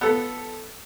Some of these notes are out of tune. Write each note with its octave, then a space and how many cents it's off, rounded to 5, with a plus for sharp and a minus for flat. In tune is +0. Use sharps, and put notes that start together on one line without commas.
B3 +0 F4 +0 A4 +0